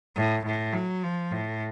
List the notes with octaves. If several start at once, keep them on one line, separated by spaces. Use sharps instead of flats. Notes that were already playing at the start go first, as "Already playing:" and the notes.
A2
A2
F#3
F3
A2